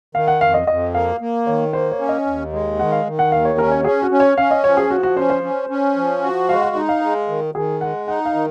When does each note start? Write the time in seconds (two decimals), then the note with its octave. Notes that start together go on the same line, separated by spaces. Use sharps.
0.15 D#3 F5
0.28 F#5
0.41 F2 F5
0.54 D#5
0.67 F2 D#5
0.94 A#3 F5
1.20 A#3
1.47 D#3 C#5
1.73 A#3 C5
1.91 C#5
2.00 C#4
2.09 D#5
2.26 D#2
2.53 G#3
2.79 D#3 F#5
2.92 F5
3.06 D#3
3.19 F#5
3.32 D#2 F5
3.45 C#5
3.58 C#4 A#4
3.72 C#5
3.84 C#4 G#4
4.02 F#4
4.11 C#4
4.20 C#5
4.38 C#4 F5
4.51 D#5
4.64 F3 C#5
4.77 G#4
4.90 F3 F#4
5.03 F#4
5.17 C#4 C5
5.30 C5
5.43 C#4
5.70 C#4
5.96 F3
6.22 F#4
6.49 G#3 F5
6.62 F5
6.75 D#4 D#5
6.89 F5
7.02 G#3
7.28 D#3
7.55 D#3 G#4
7.81 G#3 F#5
8.08 D#4 F#5
8.25 F5
8.34 D#3